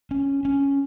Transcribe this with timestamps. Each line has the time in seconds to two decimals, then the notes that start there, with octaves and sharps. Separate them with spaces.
0.11 C#4
0.45 C#4